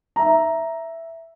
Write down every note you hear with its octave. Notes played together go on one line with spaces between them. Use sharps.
E5 A#5